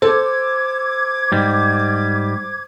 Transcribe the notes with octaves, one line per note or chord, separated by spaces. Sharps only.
A4 C5 D6 G#6
G#2 G3